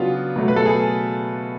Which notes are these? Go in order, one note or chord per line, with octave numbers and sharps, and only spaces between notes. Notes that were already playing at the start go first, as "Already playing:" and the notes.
Already playing: C#3 F#3 B3 D4 F4 F#4
B2 F#3 A3
B4
A4
G#4